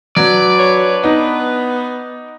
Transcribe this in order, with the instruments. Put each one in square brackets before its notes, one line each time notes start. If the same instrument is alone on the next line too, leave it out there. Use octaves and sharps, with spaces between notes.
[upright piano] F#3 [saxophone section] D4 B4 [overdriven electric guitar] D5
[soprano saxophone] C#5
[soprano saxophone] B3 [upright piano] D#4